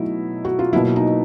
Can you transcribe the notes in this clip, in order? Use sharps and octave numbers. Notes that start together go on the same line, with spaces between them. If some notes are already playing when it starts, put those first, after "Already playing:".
Already playing: B2 F#3 A3 D#4 E4
F#4
F4
B2 F#3 A#3 E4
D#4